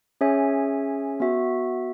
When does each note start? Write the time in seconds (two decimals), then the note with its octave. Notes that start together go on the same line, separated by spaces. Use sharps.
0.21 C#4 G#4 C#5 E5 G#5
1.20 B3 F#4 E5